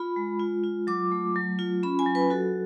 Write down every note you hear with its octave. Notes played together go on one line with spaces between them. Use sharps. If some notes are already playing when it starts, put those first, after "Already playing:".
Already playing: F4 B5
G#3
F4
F4
F#3 D6
A3
F#3
F4
C#4 B5
G#5
F#3
B4
F#4 A4